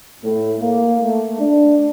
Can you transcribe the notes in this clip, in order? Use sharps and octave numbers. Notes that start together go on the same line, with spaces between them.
A2
A#3
A3
D4